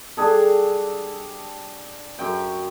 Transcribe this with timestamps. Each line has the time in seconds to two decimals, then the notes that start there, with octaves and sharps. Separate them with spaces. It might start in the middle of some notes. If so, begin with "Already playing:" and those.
0.17 G3 D4 G#4 A4
2.19 F#2 G5